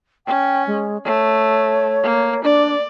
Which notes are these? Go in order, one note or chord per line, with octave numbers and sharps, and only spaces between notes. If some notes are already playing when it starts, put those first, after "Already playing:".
C#4 G5
G#3
A3 C#5
A#3
D4 D5